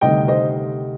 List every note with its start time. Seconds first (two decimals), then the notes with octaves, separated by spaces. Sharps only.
0.01 D2 C3 D#3 G3 D#5 G5
0.28 C5 D#5